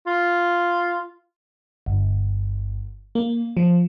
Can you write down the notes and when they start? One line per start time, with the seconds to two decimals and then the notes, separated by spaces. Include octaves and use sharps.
0.07 F4
1.86 G1
3.15 A#3
3.57 F3